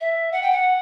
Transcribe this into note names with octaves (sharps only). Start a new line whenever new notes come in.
E5
F#5
G5
F#5